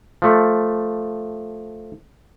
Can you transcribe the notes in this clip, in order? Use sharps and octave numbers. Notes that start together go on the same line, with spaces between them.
F3 A3